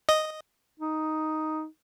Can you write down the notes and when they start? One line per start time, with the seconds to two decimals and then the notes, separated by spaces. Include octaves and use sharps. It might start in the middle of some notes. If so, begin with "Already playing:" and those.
0.09 D#5
0.80 D#4